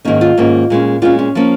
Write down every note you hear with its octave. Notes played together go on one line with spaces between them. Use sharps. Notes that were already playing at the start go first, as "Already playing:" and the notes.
G#2 D#3 A#3 C#4 D#4
F4
G#2 D#3 A#3 C#4
A#2 G#3 C#4
A#2 G#3 C#4 F4
C#4
F3 A#3 C#4